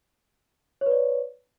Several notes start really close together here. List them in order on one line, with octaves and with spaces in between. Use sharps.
C#5 B4 D5